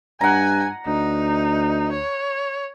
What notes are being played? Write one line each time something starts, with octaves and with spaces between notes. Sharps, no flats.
G2 F#5 G#5 A#5
D2 D#4
C#5